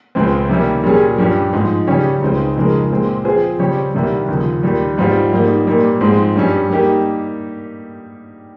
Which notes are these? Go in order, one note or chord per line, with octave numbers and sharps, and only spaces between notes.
C#2 C#3 G#3 C4
C3 D#3 G3 A#3 C#4
A#2 G3 C#4 G#4
G2 G3 C#4 G4
G#2 F3 G#3 D#4
C#3 G3 C#4 G4 C#5
C#2 C#3 G#3 C4 D#4
F2 C#3 G#3 D#4 A#4
A#2 G#3 C4
F3 C4 F4 G#4 C5
C#3 G3 C4 G4 C#5
C2 C3 D#3 G3
D#2 C#3 F3
D#2 D#3 G3
G#2 G3 C4 F4
G#2 G3 A#3 D#4
A#2 G3 A#3
G#2 F3 G#3 C4
G2 G3 C#4
G3 A#3 D#4 G4